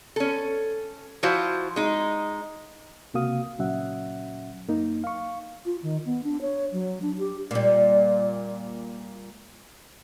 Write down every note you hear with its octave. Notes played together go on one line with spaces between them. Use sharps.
C#4 A4
F3 E4 F#4 C5 F5
G#3 D#4
C#2 C3 A#3 F#4 F5 D#6
C#2 A#2 F#3 C#4 E5 F#5
F#2 A#3 D#4
F5 C#6
F4
D#3
B3
D4
C#5
F#3
D4
G4
A#2 G3